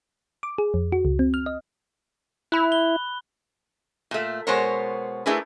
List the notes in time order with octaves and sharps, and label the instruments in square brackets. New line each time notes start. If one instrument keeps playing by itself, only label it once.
[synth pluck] D6
G#4
F2
F#4
C#2
C4
F6
D#5
[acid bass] E4 [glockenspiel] B5 F#6
[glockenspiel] G7
[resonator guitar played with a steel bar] A#2 A3
B2 G#3 B3 A#4 C5 C#5
A3 D4 E4 G#4 A#4 B4